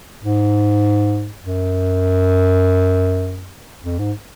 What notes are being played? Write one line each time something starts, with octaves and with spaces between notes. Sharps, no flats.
G#2
F#2
F2
G#2